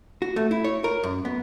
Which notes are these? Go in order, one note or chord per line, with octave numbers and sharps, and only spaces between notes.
F#4
A3
E4
C#5
A#4
F#2
B3